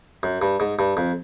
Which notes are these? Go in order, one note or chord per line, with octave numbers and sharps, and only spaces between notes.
F#2
G2
G#2
G2
F2